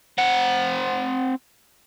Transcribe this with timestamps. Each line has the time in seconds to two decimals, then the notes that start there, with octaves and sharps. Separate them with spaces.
0.18 C4 F#5